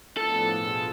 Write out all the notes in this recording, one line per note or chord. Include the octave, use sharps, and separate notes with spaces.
A2 F3 B3 D4 A4
B2 B3 F4 G#4